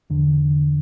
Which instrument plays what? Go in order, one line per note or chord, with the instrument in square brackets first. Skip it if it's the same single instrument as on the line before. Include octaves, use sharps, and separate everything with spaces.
[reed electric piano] E2 D3